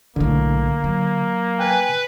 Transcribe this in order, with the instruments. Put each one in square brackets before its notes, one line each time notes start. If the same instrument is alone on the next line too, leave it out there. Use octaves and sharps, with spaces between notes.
[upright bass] B1 A2 [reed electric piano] D3 [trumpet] A#3
[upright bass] F#3
[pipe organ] B4 [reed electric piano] G5 G#5